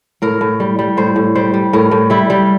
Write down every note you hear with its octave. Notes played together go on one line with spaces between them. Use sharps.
A2 A#4
A2
G3
G3
A2 C5
A2
G3 C5
G3
A2 A#4
A2
G3 E4
G3